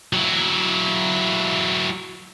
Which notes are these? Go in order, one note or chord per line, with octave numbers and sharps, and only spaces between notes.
F#3 E4